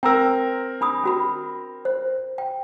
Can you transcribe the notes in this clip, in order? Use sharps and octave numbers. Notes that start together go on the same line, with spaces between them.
C4 A#4 G5 A#5 E6
D4 B5 D#6
C#4 F#4 B5
C5
G5